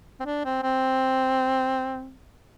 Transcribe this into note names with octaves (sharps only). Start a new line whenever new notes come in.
C4
D4
C4
C4